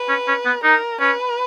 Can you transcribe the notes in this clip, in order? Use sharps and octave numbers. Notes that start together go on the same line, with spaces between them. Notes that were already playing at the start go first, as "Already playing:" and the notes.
Already playing: B4
C#4
C#4
B3
D#4 A#4
C#4 B4